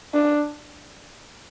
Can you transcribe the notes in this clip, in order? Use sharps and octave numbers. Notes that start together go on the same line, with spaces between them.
D4